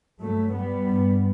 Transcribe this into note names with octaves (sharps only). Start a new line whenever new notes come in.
G2 F#3 A3
G3 B3
G2